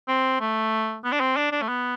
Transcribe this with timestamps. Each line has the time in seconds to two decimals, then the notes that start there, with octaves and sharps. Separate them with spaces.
0.08 C4
0.41 A3
1.04 B3
1.12 D4
1.20 C4
1.37 D4
1.52 D4
1.62 A3
1.68 B3